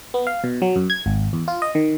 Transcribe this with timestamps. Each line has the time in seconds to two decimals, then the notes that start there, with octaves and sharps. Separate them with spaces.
0.14 B3
0.27 F5
0.44 B2
0.62 F#3
0.76 F#2
0.90 G#6
1.06 G#1
1.33 E2
1.48 F4
1.62 D#5
1.75 D#3